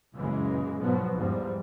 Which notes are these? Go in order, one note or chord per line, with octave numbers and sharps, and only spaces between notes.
F#2 A#2 C#3 E3 G#3
G#2 B2 F3 F#3 B3
E2 G#2 F3 G3